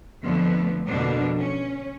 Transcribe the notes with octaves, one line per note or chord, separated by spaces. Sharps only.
F2 D3 F3 A3 B3
F2 B2 D3 F3 A#3 D4
C#4